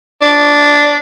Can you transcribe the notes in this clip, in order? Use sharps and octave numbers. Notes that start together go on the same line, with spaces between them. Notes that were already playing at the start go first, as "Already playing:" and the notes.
D4